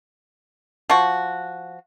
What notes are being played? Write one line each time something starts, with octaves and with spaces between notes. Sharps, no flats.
F3 F#4